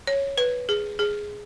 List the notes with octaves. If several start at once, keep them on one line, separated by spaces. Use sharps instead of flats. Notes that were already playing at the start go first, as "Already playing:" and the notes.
C#5
B4
G#4
G#4